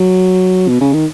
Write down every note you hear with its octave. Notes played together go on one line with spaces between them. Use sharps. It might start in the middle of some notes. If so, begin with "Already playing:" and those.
Already playing: F#3
B2
C#3
D#3